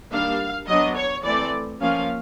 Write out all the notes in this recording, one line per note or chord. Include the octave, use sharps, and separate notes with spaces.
D#3 G3 A#3 D4 F5
F#3 B3 D4 D#5
C#5
E3 A3 C4 D5
F3 A#3 C#4 F5